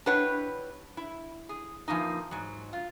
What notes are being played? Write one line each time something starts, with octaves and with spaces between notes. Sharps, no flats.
D4 E4 G4 B4 C#5 F#5
E4
G#4
E3 F3 A#3 D#4
G#2 F#3
F4